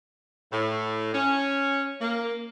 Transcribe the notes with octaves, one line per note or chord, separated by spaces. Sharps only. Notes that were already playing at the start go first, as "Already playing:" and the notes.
A2
C#4
A#3